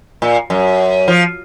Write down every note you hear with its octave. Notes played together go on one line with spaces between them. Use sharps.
A#2
F#2
F3